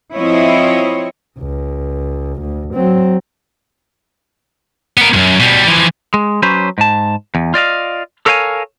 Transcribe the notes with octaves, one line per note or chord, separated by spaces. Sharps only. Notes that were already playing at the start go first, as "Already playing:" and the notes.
F3 C4 E4 C#5 D#5
C#2
D2
F#3 C4
B3 A#4
C2 F#2
B2 G3
E3 F3
G#3
F#3 C#4 B4 C5
G#2 A5
E2
F4 D5 D#5 F5
A4 A#4 C#5 F5 G5 G#5